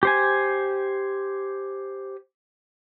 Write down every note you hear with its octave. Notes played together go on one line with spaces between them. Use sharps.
G4 C5 G#5